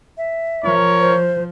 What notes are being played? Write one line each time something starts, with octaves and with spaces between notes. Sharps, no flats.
E5
F3 A#4 C#5
C5